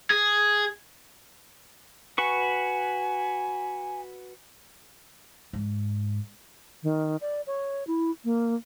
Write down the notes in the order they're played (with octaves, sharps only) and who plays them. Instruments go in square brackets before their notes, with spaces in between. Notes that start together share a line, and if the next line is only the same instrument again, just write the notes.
[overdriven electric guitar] G#4
[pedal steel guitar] F#4 B4 C#6 [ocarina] G#5
[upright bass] G#2
[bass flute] D#3
D5
C#5
E4
A#3